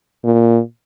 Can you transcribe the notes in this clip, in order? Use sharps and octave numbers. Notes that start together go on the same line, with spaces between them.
A#2